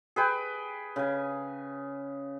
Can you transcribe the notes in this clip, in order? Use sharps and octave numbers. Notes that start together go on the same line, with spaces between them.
G#4 B4 G5
C#3 G#5